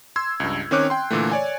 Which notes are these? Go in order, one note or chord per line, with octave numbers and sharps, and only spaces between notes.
C6 E6 G#6
C#2 G2
D#3 C4 C#4 C#5 D6 F#6
G5 C6
A#2 D3 E3 A3
C#5 D5 G#5